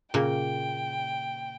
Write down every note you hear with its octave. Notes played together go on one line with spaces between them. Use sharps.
A#2 C#3 A#3 G5